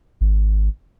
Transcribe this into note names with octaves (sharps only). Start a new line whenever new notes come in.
G#1